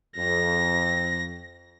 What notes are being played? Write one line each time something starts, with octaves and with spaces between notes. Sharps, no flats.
F2 A#6